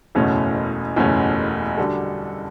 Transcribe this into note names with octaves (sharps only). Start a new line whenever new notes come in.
F#1 E2 B2 A3 C#4
F#1 E2 B2 A3 C#4
D3 G3 D4 F#4 A4